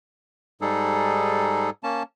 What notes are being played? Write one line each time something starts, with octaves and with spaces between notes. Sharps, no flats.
G#2 G3 D#4 G#4 A4
A#3 C#4 A5